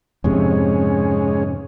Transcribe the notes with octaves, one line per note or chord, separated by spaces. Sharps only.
F2 G#2 C3 G#3 C#4